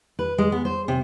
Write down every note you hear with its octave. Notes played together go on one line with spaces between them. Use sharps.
B4
G#3
B3
C5
C3